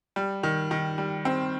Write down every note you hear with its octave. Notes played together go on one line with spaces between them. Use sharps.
G3
D#3
D#3
G3
C4